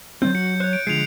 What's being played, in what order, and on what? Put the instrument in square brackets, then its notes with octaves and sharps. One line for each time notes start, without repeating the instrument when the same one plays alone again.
[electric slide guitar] D#3 C4 [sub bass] F#3 [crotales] G6
[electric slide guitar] F#4 [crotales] C#7
[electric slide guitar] C5 C#5 [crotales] F#6
[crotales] D7
[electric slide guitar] D3 F3 G#3 [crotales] C7 F7